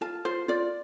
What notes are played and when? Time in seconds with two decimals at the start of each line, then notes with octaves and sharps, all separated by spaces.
0.01 F4 A5
0.25 F4 C5
0.48 F4 D5